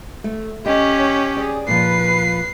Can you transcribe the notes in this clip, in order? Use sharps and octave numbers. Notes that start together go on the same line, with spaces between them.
A3
C#4 G4 D#5
C#5
G#4 D5
A#2 F3 B4 C7